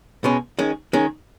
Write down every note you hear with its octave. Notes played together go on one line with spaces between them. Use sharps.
B2 G#3 C#4
D#3 G#3 C#4
D#3 G#3 C#4